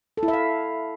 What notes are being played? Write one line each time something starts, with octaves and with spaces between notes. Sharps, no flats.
A4
E4
E5
F5